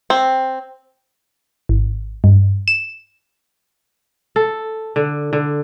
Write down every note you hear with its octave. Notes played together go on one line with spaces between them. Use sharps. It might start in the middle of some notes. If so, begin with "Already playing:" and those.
C4
G#1
G2
E7
A4
D3
D3